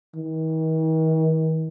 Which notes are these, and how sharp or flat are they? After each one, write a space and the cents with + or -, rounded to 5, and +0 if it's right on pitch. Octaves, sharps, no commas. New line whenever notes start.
D#3 +45